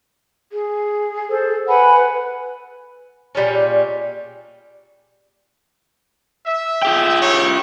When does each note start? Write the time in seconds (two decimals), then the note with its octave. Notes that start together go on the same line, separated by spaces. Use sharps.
0.52 G#4
1.29 A4 C5
1.69 B4 F#5 G#5 B5
3.35 A#2 G3 G#3 C#4
6.46 E5
6.82 F4 G#4 G5
7.22 E4 G4 C#5